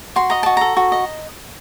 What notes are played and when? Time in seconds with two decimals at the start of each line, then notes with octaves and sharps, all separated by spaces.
0.16 F#4 C6
0.30 D#5 A#5
0.43 F#4 A5
0.57 A4 A#5
0.77 F#4
0.92 D#5